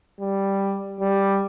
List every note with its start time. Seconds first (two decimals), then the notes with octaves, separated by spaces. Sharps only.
0.20 G3
1.01 G3